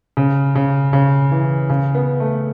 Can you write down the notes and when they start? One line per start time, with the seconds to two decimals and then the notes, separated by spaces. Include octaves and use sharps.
0.17 C#3
0.55 C#3
0.93 C#3
1.32 E3
1.70 C#3
1.95 B3
2.20 A3